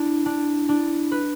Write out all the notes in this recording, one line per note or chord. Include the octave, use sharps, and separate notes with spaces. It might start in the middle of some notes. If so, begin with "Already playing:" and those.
Already playing: D4 E4
D4
D4
B4